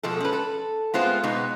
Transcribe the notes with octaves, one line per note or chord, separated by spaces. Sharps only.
B2 F3 G#3 A4
C#4 B4
A4
G#3 A3 B3 C4 F4 C5
B2 G#3 B3 D#4